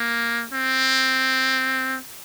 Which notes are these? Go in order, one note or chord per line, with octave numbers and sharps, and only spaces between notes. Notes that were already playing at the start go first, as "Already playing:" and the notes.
Already playing: A#3
C4